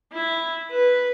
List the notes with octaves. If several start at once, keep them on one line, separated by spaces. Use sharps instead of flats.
E4
B4